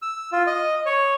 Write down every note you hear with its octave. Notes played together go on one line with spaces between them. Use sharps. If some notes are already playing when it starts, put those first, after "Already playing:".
E6
F4
D#5
C#5